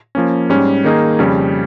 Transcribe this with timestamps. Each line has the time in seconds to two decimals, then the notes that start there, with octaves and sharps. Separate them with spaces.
0.15 F3 A#3 C#4
0.50 G#2 G3 C#4
0.84 D#3 A#3 D#4 G#4
1.19 F2 C#3 G3 C#4